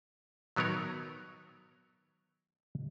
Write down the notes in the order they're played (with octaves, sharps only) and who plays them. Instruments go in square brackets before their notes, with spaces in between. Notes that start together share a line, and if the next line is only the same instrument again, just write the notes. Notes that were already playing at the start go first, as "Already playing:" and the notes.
[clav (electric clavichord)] D#3 F#3 B3 D#4 A#4 C#5